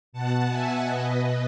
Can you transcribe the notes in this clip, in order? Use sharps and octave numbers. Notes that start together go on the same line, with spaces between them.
B2 F#5 A5
E5 G#5
B2 B4 D#5